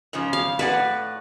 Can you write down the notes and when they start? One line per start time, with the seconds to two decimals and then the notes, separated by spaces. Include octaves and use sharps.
0.13 G#2 C#3 F3
0.33 F5
0.59 A2 B4 D5 F#5